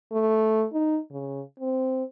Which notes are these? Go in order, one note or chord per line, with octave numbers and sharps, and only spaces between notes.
A3
D#4
C#3
C4